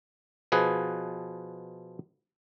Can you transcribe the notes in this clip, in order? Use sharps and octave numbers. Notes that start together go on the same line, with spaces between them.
B2 F3 G#4 B4 F#5